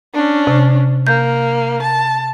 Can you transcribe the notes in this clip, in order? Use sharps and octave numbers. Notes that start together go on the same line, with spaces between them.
C#4 D4
C3
A#3 G6
A5